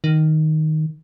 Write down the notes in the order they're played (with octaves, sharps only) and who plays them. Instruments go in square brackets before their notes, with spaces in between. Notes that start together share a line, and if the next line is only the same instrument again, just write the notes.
[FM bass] D#3